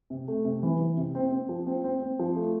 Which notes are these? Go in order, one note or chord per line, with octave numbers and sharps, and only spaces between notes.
C3
A3
C3
E3
E3
C3
C4
C4
F3
C4
C4
C4
F3
A3